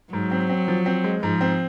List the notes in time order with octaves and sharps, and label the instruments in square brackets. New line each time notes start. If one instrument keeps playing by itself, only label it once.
[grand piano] G#2 [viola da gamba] F#3
[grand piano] C4
C4
F3
C4
G#3
[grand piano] G#2 [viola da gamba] F3
[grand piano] C4